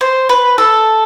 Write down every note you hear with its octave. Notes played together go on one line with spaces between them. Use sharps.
C5
B4
A4